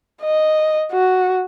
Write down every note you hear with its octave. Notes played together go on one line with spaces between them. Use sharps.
D#5
F#4